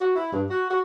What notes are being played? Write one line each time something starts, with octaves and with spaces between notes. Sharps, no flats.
F#4
E4
G2
F#4
F#4